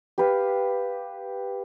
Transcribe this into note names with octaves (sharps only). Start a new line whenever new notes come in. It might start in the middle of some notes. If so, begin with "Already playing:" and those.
G4 B4 F5